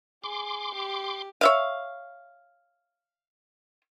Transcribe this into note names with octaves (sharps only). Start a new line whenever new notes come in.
G#4 C6 D6
G4
C#5 E5 F5